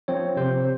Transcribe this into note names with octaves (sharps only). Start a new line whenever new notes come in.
F3 C4 C#5
C3 C5